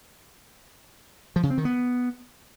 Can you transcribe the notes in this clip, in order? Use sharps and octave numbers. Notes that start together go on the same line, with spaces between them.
F3
C#3
C4
D#3
B3